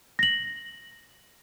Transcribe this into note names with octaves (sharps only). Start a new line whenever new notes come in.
A#6 F#7